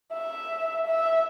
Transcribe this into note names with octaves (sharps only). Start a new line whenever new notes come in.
E5
E5